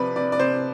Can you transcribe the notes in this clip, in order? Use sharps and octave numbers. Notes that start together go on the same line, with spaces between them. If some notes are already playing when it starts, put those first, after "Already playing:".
Already playing: C3 F3 B4 D5
C3 D5
D5
C3 C5